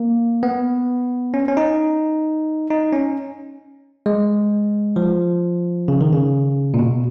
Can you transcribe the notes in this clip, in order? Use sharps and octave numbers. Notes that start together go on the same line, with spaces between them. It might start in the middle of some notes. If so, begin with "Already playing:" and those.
Already playing: A#3
B3
C#4
C#4
D#4
D#4
C#4
G#3
F3
C#3
D#3
C#3
A#2
B2